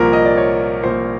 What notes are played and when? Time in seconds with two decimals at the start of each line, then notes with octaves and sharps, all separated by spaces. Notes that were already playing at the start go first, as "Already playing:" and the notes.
Already playing: C2 A#2 F3 A#4
0.13 D#5
0.26 D5
0.37 C#5
0.82 C2 A#2 F3 C5